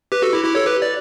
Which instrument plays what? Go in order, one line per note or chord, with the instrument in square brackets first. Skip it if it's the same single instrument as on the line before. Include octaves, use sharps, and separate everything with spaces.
[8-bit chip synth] G4 B4
F#4 A4
E4 G4
E4 G4
A4 C#5
G4 B4
D5